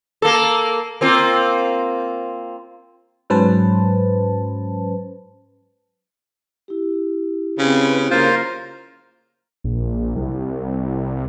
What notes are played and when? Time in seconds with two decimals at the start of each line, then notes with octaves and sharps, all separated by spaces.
0.22 A#3 A4
1.01 A#3 C4 F4
3.30 G#2 F#3 C#4 B4 C5 A5
6.68 E4 G4
7.58 C#3 C4 B4
8.11 C#3 A#3 F4 A#4 C5
9.64 A#1
10.16 C2